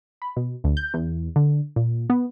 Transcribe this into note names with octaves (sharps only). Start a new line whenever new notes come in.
B5
B2
D2
G6
E2
D3
A#2
B3